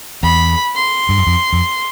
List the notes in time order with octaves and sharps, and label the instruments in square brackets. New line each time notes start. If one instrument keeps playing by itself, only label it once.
[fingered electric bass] E2 [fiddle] B5
[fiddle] C6
[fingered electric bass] G2
F#2
F2
F2